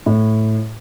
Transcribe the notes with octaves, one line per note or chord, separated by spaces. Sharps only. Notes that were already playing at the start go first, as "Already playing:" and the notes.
A2